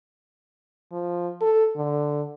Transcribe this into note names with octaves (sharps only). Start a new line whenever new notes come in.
F3
A4
D3